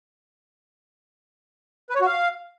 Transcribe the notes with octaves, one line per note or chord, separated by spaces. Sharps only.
B4
C#5
F#4
F5